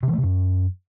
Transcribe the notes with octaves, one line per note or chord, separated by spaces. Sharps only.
C3
E3
A3
C3
F#2